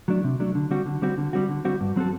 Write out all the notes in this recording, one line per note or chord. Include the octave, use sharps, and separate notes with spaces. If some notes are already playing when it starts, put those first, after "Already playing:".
F#3 A3 D4
C3
F#3 A3 D4
D3
G3 C4 F#4
D3
G3 C4 F#4
D3
G3 C4 F#4
D3
G3 C4 F#4
G2
F#3 C4 F#4 A4